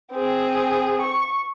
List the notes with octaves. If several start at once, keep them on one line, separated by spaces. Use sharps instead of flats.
C4 G#4
C#6